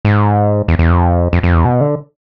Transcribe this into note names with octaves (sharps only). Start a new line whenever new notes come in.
G#2
E2
E2
F2
F2
F2
E2
B2
D3